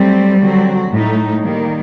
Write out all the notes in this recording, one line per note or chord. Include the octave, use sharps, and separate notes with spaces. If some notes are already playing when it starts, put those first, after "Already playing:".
Already playing: F#3 G3 A3 C4
D3 F#3 C4 F#4
A2 A3 D#4
D#3 G3 A#3